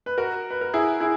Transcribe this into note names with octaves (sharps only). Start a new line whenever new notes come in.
B4
F#4 A#4
B4
A#4
E4 G#4
E4 G#4